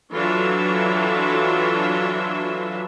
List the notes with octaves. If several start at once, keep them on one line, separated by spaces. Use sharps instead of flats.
E3 F#3 D4 F4 A4 E5